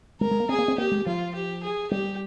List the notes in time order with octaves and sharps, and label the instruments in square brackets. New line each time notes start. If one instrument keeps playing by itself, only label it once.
[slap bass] G#3 [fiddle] A#4
[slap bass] G#3
A#3
[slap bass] C4 [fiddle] G#4
[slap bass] A#3
C4
[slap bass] A#3 [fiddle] G4
[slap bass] G#3
[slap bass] F3 [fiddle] F4
[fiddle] G4
G#4
[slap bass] G3 [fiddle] G4